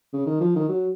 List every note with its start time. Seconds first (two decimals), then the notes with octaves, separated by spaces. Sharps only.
0.13 C#3
0.26 D#3
0.41 F3
0.56 D#3
0.69 F#3